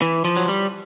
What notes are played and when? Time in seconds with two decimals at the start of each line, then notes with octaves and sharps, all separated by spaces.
0.02 E3
0.25 F3
0.37 F#3
0.48 G3